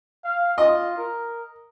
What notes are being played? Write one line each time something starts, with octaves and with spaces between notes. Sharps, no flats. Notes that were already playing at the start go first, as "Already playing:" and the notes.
F5
F4 D#5
A#4